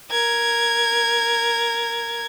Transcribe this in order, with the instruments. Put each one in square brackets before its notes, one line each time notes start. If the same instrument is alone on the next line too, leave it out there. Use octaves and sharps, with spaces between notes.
[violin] A#4 G#6